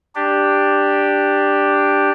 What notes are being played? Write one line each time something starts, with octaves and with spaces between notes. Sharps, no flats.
D4 G4